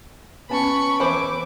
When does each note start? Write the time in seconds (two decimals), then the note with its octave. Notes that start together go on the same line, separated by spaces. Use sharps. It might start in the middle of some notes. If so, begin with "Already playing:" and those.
0.50 B3 C#4 A5 B5 C#6
1.00 E3 C5 B5 D6